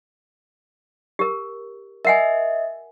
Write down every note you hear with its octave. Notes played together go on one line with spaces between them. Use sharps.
G4 A#4
A#4 D#5 E5 F#5 G#5